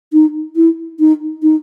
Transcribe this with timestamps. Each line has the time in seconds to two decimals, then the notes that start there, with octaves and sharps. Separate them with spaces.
0.13 D#4
0.56 E4
1.00 D#4
1.43 D#4